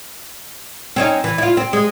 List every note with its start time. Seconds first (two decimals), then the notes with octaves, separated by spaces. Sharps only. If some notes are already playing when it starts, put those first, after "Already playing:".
0.96 C4 C#4 D#4
1.24 E3
1.38 E4 F4
1.57 C4
1.73 G#3